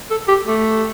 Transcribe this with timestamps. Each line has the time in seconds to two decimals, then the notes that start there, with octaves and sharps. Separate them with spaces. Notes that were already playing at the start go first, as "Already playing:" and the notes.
0.11 A4
0.28 G4
0.47 A3